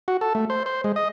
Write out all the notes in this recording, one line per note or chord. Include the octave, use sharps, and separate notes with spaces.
F#4
A4
A3
C5
C5
G#3
D#5